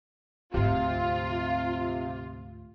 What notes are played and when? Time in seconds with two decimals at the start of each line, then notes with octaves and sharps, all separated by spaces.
0.54 D2 G#2 C3 F4